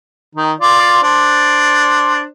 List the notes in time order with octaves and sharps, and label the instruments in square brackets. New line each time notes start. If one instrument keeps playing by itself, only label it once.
[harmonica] D#3 D#4
F4 D5
D4 C5